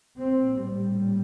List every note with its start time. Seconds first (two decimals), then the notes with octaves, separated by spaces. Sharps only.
0.19 A#1 A2 C4
0.59 G3